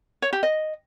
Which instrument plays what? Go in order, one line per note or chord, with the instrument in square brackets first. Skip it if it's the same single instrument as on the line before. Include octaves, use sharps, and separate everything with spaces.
[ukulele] C#5
G4
D#5